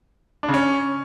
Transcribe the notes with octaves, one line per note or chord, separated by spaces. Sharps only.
D4
C#3
C#4